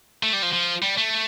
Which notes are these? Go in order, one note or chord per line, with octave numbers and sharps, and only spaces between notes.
A3
G3
F3
F3
G3
A3